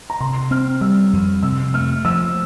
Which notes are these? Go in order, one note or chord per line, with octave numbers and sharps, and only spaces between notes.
A#5
C3 C6
C4 F6
G3 E6
F2
C3 E6
A3 F6
F3 E6